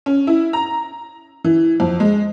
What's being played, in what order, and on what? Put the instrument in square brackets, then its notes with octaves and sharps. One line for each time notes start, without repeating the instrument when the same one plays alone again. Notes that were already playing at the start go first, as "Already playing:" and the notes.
[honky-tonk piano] C#4
E4
A#5
E3
F2
G#3